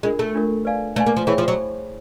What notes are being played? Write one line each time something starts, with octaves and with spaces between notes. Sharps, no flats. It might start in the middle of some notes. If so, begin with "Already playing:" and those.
G#3 D4 F4 A#4
A3
D4 F4 A#4
B4 D5 F5 G#5
A3 B4 D5 F5 G#5
A#3
F3
E3 G#4 C#5 E5 G5 B5
F3
F#3